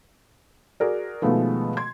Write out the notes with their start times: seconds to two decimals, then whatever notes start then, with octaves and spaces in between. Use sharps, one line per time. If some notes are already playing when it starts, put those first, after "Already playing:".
0.80 F#4 G#4 A#4 D5
1.22 B2 D#3 F3 G#3 A3 B3
1.77 C6 G#6